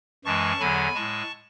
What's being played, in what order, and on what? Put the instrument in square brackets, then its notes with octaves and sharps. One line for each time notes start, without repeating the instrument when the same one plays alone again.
[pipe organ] F#2 E3 G#3 A5 C#6
E2 D3 F#3 G#5 B5
A2 G#3 A5 C#6